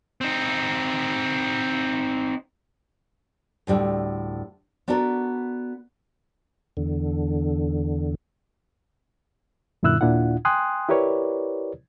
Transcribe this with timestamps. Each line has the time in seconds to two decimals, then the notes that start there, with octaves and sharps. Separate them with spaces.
0.21 C4 D#4
3.67 D2 A2 G3 D4
4.88 B3 D4 F#4 A4 A#4
6.77 E2 D3
9.83 F#2 A#2 D3 E4 E6 F#6
10.01 D#2 A#2 D4 E4 F4 F#5
10.45 G5 G#5 C6 D#6 F#6
10.89 E4 G4 A#4 B4 C#5 D5